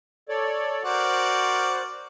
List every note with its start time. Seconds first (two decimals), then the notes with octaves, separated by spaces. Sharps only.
0.29 A4 C#5 D5
0.84 F#4 A#4 C5 D5 F#6